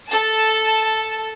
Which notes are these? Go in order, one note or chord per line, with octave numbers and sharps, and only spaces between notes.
A4 A5